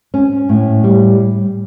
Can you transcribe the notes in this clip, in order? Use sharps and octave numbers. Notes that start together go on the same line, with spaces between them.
C#4
A2
G3